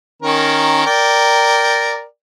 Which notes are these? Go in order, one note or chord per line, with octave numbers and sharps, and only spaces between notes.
D#3 C#4 A#4
A#4 D5 G5